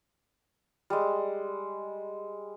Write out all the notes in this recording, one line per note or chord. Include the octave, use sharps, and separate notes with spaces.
G3 G#3